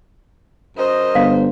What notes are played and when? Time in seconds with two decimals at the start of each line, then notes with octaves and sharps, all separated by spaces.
0.77 F#2 A#4 C5 D#5
1.15 G1 F5